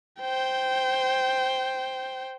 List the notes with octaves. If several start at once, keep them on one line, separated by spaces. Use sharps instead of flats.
C5 G5